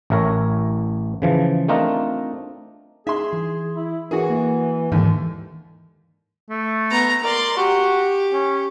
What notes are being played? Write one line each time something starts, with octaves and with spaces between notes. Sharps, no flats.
A1 A2 E4 A#4 C#5
C#3 E3 F3
A3 C4 D4 D#4 F4 A#4
D#4 G#4 E5 C6
E3
E4
E3 F#4 G#4 A#4 C#6
A#3
D#2 G#2 D3 E3
A3
B3 A#5
A#4 D5 C6
F#4 G4
C#4